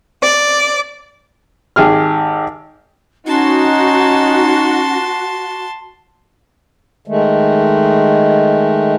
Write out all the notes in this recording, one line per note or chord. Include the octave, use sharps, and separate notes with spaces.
D5
G#1 G4 G#4 F6
C#4 D#4 F#4 A5 C6
D#3 G#3 A3